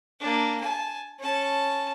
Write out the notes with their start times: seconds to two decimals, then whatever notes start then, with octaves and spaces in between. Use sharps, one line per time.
0.20 A#3 D4
0.60 G#5 A5
1.19 C#4 A5